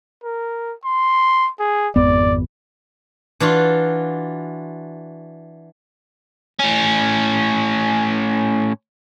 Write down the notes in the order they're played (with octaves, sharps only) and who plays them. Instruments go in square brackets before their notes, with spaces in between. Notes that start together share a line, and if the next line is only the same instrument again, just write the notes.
[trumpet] A#4
C6
G#4
[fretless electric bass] G#1 F2 B3 [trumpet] D5
[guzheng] E3 D4 F4 F#4
[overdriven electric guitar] A2 C#4